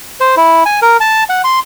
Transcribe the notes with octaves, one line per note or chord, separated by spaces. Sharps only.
C5
E4
G#5
A#4
A5
F#5
C6